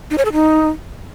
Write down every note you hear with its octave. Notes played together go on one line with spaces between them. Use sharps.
D#4
C#5
A4
D#4